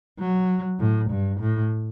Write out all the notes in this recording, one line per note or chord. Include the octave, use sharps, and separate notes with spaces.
F#3
A2
G2
A2